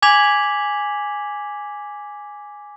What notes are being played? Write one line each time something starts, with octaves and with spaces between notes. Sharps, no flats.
G#5 D6 G#6 B6 F7 F#7